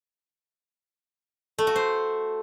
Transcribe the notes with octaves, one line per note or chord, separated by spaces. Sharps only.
A3
F#4
C5